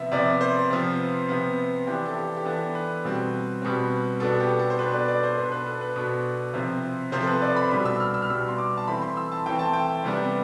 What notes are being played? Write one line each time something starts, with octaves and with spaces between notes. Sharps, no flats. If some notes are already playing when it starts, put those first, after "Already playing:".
Already playing: C3 F3 B3 E5
C3 F3 B3 D5
C5
C3 F3 B3
C3 F3 B3
E3 B3 D4 G4
A4
G4
G4
E3 B3 D4 A4
B4
B2 G3 C4
B2 G3 C4
B2 B3 D4 A4
G4
A4
C5
B2 B3 D4 B4
D5
D5
C5
B2 B3 D4 C5
B4
A4
B4
B2 B3 D4
C3 F3 C4
C3 F3 C4 C5
A4
B4
D5
B5
B2 G3 D4 B5
E6
F6
E6
F6
B2 G3 D4 E6
C6
D6
A5
E3 A3 C4 B5
C6
E6
A5
E3 A3 C4 G5
A5
G5
C3 G3 B3 D4